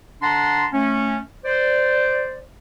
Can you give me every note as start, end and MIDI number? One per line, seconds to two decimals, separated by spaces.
0.22 0.65 50
0.22 0.65 62
0.22 0.65 78
0.22 0.65 81
0.22 0.65 82
0.22 0.65 84
0.73 1.18 57
0.73 1.18 61
1.45 2.39 72
1.45 2.39 74